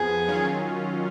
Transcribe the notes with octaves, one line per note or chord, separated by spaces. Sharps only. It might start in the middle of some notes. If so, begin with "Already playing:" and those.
Already playing: F2 F3 B3 G#4
D#3 F#3 C#4 F4